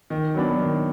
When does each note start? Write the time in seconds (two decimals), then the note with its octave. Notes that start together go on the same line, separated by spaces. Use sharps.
0.10 D#3
0.35 F#3 B3 D4
0.58 D#3